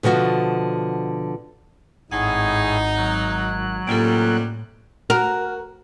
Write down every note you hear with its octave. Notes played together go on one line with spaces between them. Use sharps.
B2 D3 F3 F#4
G#1 A2 D#4 G#4 F#5 G#5
F#3 F#6
F#2 A2 C3 G3 A#3 F4 A4
F#4 A#4